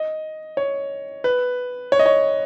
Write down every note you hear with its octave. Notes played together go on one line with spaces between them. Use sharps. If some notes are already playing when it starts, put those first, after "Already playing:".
Already playing: D#5
C#5
B4
C#5
D#5
C#5